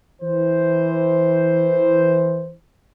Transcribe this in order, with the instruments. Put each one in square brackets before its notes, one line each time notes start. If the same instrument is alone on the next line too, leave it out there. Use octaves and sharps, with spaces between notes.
[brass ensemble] E3 C5